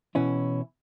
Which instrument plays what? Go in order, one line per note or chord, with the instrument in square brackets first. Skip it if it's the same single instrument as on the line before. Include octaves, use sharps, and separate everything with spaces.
[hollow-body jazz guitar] B2 E3 C#4 E4